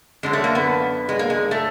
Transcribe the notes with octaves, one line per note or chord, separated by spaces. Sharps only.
F#2 D3 F#3 G#3
A3
A#3
B3
G#3
A#3
G#3
A3